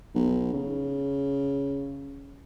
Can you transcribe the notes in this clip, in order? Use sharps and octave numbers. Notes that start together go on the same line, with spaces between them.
B1
C#3